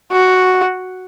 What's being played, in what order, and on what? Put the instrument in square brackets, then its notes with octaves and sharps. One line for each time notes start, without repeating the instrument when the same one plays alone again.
[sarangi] F#4